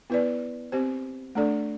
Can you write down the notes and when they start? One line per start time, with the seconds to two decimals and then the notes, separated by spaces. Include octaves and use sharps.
0.10 B3 E4 B4 D5
0.72 C4 G4 C5
1.35 A3 D4 A4 D5